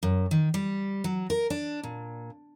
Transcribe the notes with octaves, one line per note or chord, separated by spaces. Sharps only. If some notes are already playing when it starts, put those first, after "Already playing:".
F#2
D#3
G3
F#3
A#4
D4
A#2